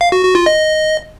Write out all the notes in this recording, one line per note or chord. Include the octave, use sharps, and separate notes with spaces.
F5
F#4
F#4
F4
D#5